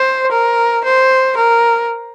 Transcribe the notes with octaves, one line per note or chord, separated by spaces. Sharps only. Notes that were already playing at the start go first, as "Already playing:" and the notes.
Already playing: C5
A#4
C5
A#4